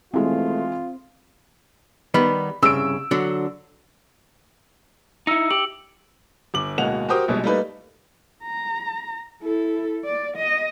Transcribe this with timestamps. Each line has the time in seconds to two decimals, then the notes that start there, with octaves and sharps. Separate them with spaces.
0.14 D#2 B2 E3 G#3 A3 C4 F4
2.14 D#3 G3 B3 B5
2.63 C2 G2 C#3 E6 D7
3.11 D3 F#3 D4
5.27 D#4 E4 E6 C#7
5.51 G4 F#7
6.54 G1 D6 F#7
6.78 D1 B2 G#3 A#3 F#5 F7
7.09 F#4 G4 A#4 C5 D#6
7.28 A#1 B2 G3 G#3
7.44 G3 A3 A#3 D#4 B4
8.43 A#5
9.43 E4 A4
10.05 D5
10.37 D#5